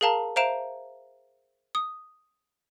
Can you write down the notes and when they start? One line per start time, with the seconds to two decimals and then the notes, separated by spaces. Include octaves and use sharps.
0.01 G#4 A#4 F5 A5 A#5
0.36 C5 E5 F5 A#5 D7 E7
1.75 D#6